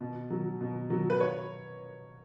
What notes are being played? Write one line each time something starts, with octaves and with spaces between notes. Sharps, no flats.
B2
F#3
B2
F#3
B4
C#5